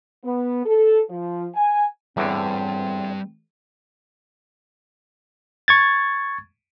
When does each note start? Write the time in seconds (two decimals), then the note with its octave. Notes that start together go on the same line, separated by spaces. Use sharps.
0.25 B3
0.66 A4
1.10 F3
1.55 G#5
2.17 E2 A2 D3 G3 C4 B4
5.68 C#6 G#6 A6